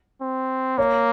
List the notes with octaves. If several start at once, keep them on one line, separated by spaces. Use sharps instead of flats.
C4
A#3 C#5